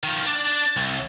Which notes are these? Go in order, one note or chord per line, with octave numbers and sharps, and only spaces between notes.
D#3 F3
D4 D5
C2